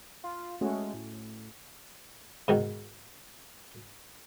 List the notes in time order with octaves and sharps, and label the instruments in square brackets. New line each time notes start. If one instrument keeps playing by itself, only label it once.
[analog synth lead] F4
[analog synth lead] G#3 [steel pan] A3 C#4 F#4
[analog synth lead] A2
[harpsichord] G#2 B2 D#3